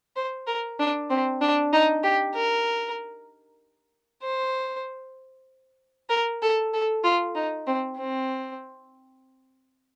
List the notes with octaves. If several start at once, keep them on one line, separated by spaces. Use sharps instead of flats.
C5
A#4
D4
C4
D4
D#4
G4
A#4
C5
A#4
A4
A4
F4
D#4
C4
C4